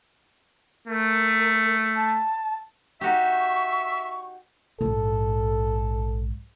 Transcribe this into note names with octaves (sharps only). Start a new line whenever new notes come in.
A3 A#4
A5
D#4 F#4 G4 E5 C#6
A#1 G#2 A4